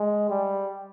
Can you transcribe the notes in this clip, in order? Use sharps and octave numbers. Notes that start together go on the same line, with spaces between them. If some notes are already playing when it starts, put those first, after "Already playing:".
Already playing: G#3
G3